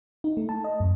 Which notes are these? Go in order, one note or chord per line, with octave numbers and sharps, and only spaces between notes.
D#4
A3
A5
D#5
F#2